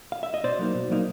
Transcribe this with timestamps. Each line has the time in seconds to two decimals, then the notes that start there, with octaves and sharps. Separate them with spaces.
0.12 F5
0.23 E5
0.34 D#5
0.44 B2 C5 D5
0.59 F#3 A#3 D#4
0.75 B2
0.90 F#3 A#3 D#4